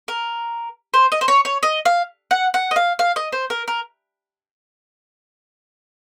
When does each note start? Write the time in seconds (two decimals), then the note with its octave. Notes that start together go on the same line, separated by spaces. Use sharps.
0.08 A#4
0.94 C5
1.12 D#5
1.21 C5
1.28 C#5
1.45 C#5
1.63 D#5
1.85 F5
2.31 F#5
2.54 F#5
2.71 D#5
2.76 F5
2.99 F5
3.16 D#5
3.32 C5
3.50 A#4
3.68 A#4